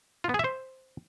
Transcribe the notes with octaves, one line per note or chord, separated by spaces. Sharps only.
F4
B3
G#4
E5
C5